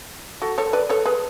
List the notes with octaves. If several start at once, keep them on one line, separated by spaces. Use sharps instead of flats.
F#4 A4
A4 C#5
B4 D5
A4 C#5
G#4 B4